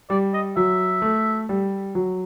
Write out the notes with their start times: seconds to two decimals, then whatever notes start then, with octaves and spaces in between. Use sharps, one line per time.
0.10 G3 D5
0.33 D#5
0.57 F#3 E5
1.02 A3
1.49 G3
1.95 F#3